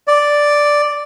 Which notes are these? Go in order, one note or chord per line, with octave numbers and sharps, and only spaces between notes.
D5